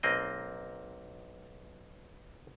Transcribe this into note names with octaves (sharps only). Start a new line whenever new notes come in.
B1 A#3 C4 D#5